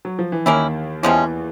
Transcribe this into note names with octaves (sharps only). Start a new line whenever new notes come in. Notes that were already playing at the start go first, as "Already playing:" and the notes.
F#3
F3
E3
D#2 D#3 A#3 C#4 E4
E2 C3 E3 F3 G#3 C#4